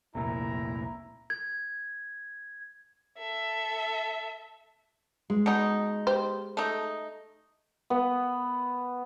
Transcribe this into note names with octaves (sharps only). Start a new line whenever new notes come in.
F1 C2 A#2 E4 A#5
G#6
A4 E5
G#3
B2 D#4
G4 C5
A3 D#4
B3